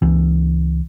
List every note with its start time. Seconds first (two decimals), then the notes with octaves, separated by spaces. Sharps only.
0.02 C#2 E3